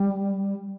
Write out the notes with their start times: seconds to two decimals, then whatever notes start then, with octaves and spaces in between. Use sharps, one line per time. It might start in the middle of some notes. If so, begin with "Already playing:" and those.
Already playing: G3